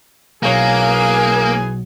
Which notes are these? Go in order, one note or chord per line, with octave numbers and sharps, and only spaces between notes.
B1 E3 A#3 C#4 G#4 C#5